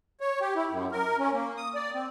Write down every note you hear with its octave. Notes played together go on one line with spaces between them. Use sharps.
C#5
G4
E4
F#2
A#4
C#4
A#3
D#6
D5
C4